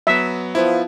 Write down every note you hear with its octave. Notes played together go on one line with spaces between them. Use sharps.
F#3 B3 E5
F3 B3 E4